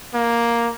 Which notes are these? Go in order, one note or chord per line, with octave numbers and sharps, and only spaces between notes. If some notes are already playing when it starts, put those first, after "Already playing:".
A#3